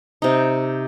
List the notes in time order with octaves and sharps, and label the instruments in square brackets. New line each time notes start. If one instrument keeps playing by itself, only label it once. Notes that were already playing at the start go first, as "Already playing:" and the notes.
[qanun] C3 D#4